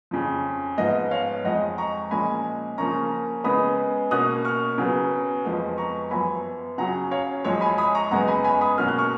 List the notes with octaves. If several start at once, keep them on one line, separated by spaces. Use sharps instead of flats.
F2 C#3 F3
G#2 F3 B3 D#5
C#5 F5
F2 F3 G#3 D#5 F#5
A#5 C#6
A#2 F3 G#3 C#4 G#5 B5
C#3 F3 A#3 C#4 A#5 C#6
C#3 G#3 B3 B5 D#6
B2 A#3 C#4 D#6 F#6
C#6 F6
C#3 F#3 B3
F2 F3 G#3 B3
A#5 C#6
F#2 F3 B3 G#5 B5
C#3 F#3 C#4 F#5 A#5
C#5 F5
F#2 F3 G#3 C#5
G#5 B5
B5 D#6
A#5 C#6
F#2 C#3 G#3 B3 F#5 A#5
G#5 B5
G#5 B5
B5 D#6
B2 F#3 A#3 C#4 F6
F#6
C#6 F6